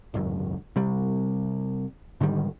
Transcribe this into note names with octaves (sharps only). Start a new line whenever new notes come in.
D1 G#1 C#2 F#2
C3 G3
G#2 D3 D#3 G3